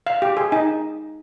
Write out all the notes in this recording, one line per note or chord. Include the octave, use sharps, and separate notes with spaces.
F5
G4
G#4
D#4